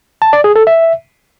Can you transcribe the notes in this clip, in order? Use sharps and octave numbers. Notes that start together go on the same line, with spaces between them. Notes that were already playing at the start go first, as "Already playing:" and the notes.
A5
D5
G#4
A4
E5